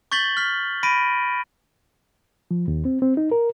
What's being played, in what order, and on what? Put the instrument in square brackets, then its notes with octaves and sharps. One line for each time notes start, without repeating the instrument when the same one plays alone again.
[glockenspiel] C#6 G6 A6 B6 F#7 G7
F6 B6
B5 A#6 D7 D#7
[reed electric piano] F3
D#2
C4
C4
D#4
A#4